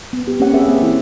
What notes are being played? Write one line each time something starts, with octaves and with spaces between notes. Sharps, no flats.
B3
G4
A#3 C4 C#4 G4 C#5 F#5
C4 G4 G#4 B4 E5
A#3
E3 E4